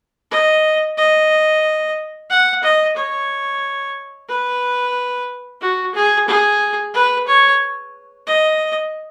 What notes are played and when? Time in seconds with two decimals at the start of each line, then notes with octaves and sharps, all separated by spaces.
0.31 D#5
0.97 D#5
2.30 F#5
2.63 D#5
2.96 C#5
4.28 B4
5.61 F#4
5.94 G#4
6.27 G#4
6.94 B4
7.27 C#5
8.26 D#5